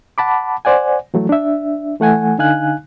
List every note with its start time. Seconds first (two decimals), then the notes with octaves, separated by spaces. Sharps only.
0.18 F#5 A5 B5 D6
0.65 C5 D5 F#5 G#5
1.14 E3 F#3 A3
1.29 D4 E5
2.00 E3 A3 F#5 G#5
2.38 D3 D#4 F5 G#5 F#6